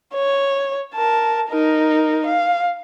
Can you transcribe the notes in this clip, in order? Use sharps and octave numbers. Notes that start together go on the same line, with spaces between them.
C#5
A#4 A5
D#4 A#4
F5